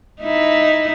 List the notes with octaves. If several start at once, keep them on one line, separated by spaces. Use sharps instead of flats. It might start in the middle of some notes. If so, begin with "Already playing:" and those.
D#4 E4